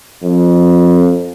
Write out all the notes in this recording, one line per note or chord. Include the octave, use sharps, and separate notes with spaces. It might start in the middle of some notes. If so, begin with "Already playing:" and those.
F2